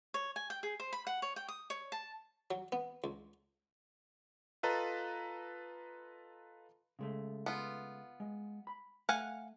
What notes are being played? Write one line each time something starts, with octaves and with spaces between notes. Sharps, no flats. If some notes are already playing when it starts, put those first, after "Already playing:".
C#5
G#5
G5
G#4
C5
B5
F#5
C#5
G5
D#6
C#5
A5
F#3
B3
C#2
F4 A4 B4 D#5 A5 A#5
C#3 G#3 A3
B3 F4
G#3
B5
A3 F5 F#5 G#5